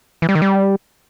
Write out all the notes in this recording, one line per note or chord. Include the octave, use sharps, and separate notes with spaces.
E3
G3
D#3
G3